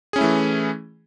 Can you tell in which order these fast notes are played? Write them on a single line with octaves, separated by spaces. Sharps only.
G#4 C#4 E4 A3 E3